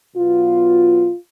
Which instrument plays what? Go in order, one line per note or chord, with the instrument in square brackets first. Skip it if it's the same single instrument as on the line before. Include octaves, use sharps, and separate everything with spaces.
[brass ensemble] B2 F#3 B3 F4